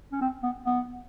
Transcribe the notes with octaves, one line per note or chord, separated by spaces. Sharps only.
C#4
C4
B3
B3